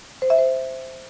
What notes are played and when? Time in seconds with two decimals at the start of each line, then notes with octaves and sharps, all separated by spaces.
0.22 C5
0.30 E5
0.38 C5